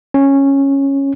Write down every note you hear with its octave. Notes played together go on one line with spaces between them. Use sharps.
C#4